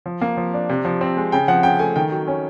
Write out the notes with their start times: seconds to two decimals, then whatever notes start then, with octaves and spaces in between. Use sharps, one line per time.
0.06 F3
0.22 A#3
0.37 F3
0.54 D4
0.69 C3
0.85 F3
1.01 C4
1.17 G#3
1.32 C#3 G5
1.48 F3 F#5
1.63 C#3 G5
1.79 A3 G#5
1.96 D#3 G5
2.11 F#3
2.27 C#4